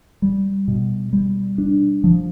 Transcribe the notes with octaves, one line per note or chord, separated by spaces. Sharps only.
G3
B2
G3
D4
F3